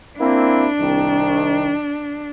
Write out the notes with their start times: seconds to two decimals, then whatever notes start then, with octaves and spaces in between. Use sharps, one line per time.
0.20 A#3 C4 D4 E4
0.80 C2 D#3